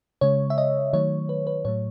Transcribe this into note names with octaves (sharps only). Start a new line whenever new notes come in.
C#3 G#3 C#5
E5
D#5
D#3 F#3 A3 C#5
B4
B4
A2 F#3 A3 C#5